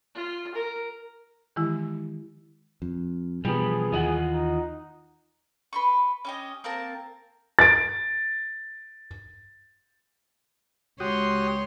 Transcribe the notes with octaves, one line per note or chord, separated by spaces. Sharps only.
F4
A#4
D#3 E3 G#3 E4 G4
F2
B2 E3 F3 G3 B3 G#4
D#2 D#3 E3 F4 D#5 F#5
D#4
B4 C6 C#6
C#4 G4 D#5
A#3 C4 A#4 A5
A6 D7
C#2 F#4 G4 C#5 C6 D#6